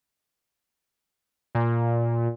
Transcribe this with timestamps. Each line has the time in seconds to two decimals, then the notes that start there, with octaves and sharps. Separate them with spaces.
1.55 A#2